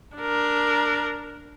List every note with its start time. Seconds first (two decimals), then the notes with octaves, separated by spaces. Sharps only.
0.17 D4 A#4